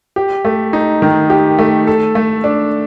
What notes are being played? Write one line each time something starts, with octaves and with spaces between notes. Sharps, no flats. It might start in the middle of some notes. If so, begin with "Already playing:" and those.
G4
A3
D#4
D#3
G4
A3
A4
A3
D4